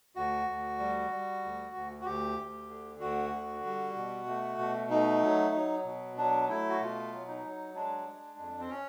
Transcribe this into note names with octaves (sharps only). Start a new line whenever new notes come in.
D2 F#4
D2
G3
G3
D2
D2
F#4
D2 G4
D2
D3
D2 F#4
D3
G3
B2
A3
B2
A3 D#4
F#3
F#3
B2
F#3 D4
A3 E4
F#4
B2 F4
F#3
D#4
F#3
G#3 D4
G#3
F2
C4
C#4